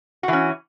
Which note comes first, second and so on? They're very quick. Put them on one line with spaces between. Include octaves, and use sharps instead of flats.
F#4 E3 C#4